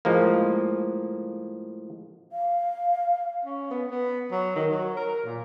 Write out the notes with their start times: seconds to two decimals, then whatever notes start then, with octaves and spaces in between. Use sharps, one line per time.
0.05 A2 F3 G#3 A#3
2.32 F5
3.45 C#4
3.71 B3
3.91 B3
4.31 F#3
4.56 D#3
4.72 F#3
4.97 A#4
5.25 A#2